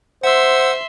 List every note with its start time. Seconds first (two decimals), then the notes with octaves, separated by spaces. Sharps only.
0.23 C5 E5 F#5 C6 E6